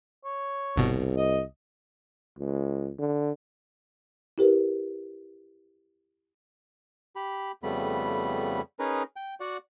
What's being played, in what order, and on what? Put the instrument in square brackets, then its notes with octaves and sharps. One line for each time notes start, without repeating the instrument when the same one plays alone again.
[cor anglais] C#5
[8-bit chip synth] G1 B2 [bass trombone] C2
[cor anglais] D#5
[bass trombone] C#2
D3
[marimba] E4 G4 A#4 B4
[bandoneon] G4 B5
F2 C#3 G3 A3 B3 B5
C#4 D#4 G#4 A#4 B4
G5
F#4 D5 F#5